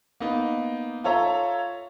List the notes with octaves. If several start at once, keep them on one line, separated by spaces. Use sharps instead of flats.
A#3 B3 D#4
F4 A4 C#5 E5 A#5